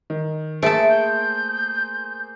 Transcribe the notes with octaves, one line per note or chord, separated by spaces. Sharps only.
D#3
A3 A#3 G#4 A4 C5 D7
G6